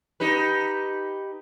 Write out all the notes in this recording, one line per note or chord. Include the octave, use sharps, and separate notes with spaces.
D#4 G4 B4